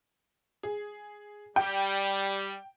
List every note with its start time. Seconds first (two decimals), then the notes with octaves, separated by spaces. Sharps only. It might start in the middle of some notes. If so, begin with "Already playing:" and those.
0.63 G#4
1.56 G3 G5